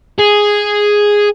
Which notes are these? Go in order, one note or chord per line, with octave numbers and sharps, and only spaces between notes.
G#4